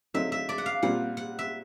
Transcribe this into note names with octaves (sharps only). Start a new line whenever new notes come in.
D3 F#3 A3 C4 D#4 E5
E5
D5
F#5
F5
A#2 G3 C4 F4 F#5
F#5
E5